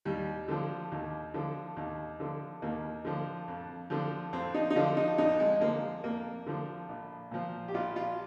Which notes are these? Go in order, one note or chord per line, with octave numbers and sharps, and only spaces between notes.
D#2 G3
D3 F3
D#2
D3 F3
D#2
D3 F3
D#2 A#3
D3 F3
F2
D3 F3
F2 C4
D#4
D#4
D3 F3 F4
D#4
F2 D#4
G#3
D3 F3 A#3
F2 A#3
D3 F3
A#1
A#2 F3
G4
A#1 F4
F4